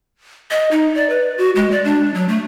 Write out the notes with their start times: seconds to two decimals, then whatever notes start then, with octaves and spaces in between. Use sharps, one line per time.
0.51 D#5
0.71 D#4
0.95 D5
1.10 B4
1.38 F#4
1.56 G#3
1.71 D5
1.85 D4
2.14 F#3
2.28 A3